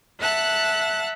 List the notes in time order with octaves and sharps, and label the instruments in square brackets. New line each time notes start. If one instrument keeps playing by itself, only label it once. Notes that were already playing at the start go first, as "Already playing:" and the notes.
[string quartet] E5 F#5 A5 F#6